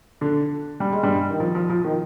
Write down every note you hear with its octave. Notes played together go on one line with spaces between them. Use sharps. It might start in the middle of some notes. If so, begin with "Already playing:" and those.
D3 D4
G3
G#3
G2 G3
D#3
F3
F3
F3
D#3